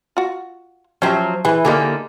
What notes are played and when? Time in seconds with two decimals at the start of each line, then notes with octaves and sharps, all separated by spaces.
0.17 F4 F#4
1.02 F3 F#3 C#4 G4 E5
1.45 E3 G#4 B4
1.65 D3 G#3 A#3 D#4 G4 G#4